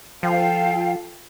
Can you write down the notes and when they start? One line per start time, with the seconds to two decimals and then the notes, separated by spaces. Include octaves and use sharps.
0.23 F3 F4 A4 F5 G5